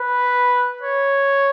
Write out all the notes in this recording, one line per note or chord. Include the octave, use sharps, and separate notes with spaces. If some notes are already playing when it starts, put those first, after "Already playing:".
Already playing: B4
C#5